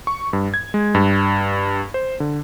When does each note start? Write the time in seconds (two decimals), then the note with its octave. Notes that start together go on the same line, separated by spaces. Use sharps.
0.07 C#6
0.33 G2
0.54 G#6
0.74 G#3
0.95 G2
1.94 C5
2.20 D3